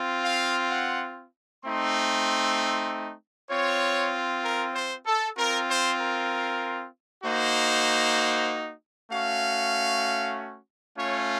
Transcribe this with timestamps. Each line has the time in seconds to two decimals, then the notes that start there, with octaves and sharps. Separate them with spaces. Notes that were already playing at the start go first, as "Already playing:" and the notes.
Already playing: C4 F4
0.24 F5
0.71 F#5
1.64 A3 C4 D#4 C6
3.50 C4 F4 C#5
4.44 A#4
4.74 C5
5.06 A4
5.37 C4 F4 A#4
5.68 C5
5.99 A#4
7.24 A#3 D#4 F#4 C5
9.10 A3 C#4 F#4 F5
10.96 A3 C#4 F4 C#5